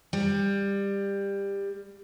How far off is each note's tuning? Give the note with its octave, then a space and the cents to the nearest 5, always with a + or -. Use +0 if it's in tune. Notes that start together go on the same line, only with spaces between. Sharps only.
G3 +20